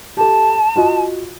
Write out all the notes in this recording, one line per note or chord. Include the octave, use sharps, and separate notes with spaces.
G4 A4 A5
F4 F#4 D#5